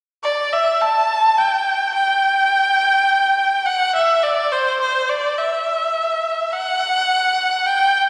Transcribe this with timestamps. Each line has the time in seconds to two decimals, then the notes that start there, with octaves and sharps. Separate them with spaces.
0.23 D5
0.53 E5
0.81 A5
1.38 G5
1.95 G5
3.66 F#5
3.95 E5
4.23 D5
4.52 C5
4.81 C5
5.09 D5
5.38 E5
6.52 F#5
7.66 G5